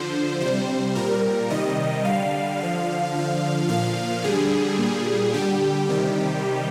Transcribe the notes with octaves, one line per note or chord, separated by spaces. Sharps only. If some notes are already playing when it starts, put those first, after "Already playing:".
Already playing: D3 F3 C5
C3 G3 C5
A#2 G3 A#4
C3 D#3 G3 D#5
D3 G3 F5
D3 F3
D3 F3
A#2 F3 F5
D3 G3 G#4
A#2 G3
D3 G3 G4
C3 D#3 G3